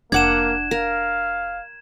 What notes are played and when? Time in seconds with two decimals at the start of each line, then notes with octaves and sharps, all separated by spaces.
0.12 F1 A#3 D4 F#5 G#6 E7
0.71 A#4 F5